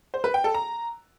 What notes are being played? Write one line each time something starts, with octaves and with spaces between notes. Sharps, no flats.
C5
B4
G5
A4
A#5